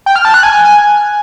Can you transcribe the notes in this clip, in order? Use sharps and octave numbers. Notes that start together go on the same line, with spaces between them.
G5
F6
A5
F#6
G#5